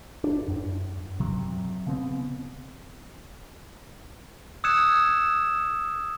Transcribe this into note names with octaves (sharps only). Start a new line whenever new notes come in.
D4
F#2
C3 F#3
C#3 B3 C4
D#6 E6 F#6 G#6 C#7 E7